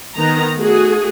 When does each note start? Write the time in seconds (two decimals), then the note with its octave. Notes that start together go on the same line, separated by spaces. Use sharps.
0.17 D#3 B3 A#5
0.57 A3 F#4 G#4